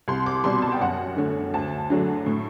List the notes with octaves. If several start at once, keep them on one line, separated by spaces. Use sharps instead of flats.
C2 C6
D6
B2 G3 C6
A5
G5
F#2 F#5
D3 A3
D2 A5
D3 F#3 A3
A2